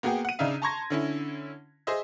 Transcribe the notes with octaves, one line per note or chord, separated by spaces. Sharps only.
A#3 B3 F#4 G#4 G5
F#5 D#7
C#3 D4 D#4 E5 F5
A5 A#5 C6 C#6 G#6 A#6
D3 C#4 E4
G#4 C5 D#5 E5